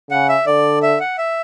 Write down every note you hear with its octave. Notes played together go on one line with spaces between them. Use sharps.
C#3 F#5
E5
D3 D5
E5
F#5
E5